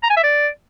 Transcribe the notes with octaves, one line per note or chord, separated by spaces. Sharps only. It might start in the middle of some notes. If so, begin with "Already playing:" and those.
A#5
G#5
E5
D5